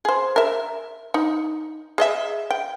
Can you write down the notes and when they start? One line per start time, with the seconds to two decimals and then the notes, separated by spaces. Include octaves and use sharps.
0.05 G#4 C5
0.36 A#4 E5
1.14 D#4
1.98 G#4 D#5 E5
2.51 G5